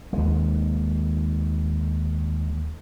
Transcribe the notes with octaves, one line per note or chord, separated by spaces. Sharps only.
D#2 G#3